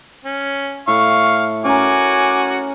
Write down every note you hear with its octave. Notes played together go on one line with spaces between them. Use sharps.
C#4
A2 F5 C#6
C#4 F#4 A#4 G#5 D6